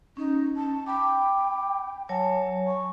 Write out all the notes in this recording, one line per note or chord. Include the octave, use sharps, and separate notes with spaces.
C#4 D#4
A5
G5 B5 D6
F#3 C#5 G#5 A5
C#6